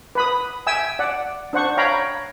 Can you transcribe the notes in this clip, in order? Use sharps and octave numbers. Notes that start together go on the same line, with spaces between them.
B4 B5 D#6
E5 G5 G#5 E6
D5 F#5
D4 C5 F#5 C#6
C#5 F5 G5 A#5 B5